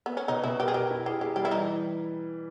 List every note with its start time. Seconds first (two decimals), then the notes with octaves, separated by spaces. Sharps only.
0.06 B3
0.17 C#4
0.28 B2 D#4
0.44 B2 E4
0.59 G4 A#4
0.68 G#4
0.74 G4 A#4
0.90 E4
1.06 G4 G#4
1.21 G4 G#4
1.36 G3 G4
1.45 E4
1.51 E3 D#4